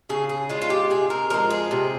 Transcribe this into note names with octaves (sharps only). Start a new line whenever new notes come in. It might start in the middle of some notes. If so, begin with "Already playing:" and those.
C#3 G#4
G#4
G#3 F4
F4
G4
C3 G#4
A#4
F3 G#3 A#4
G#4
C3